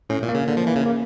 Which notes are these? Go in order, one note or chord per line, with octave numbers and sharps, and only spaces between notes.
A2 C#4
A#2
A#3
C#3
D3
F3
E3
C#3
A#3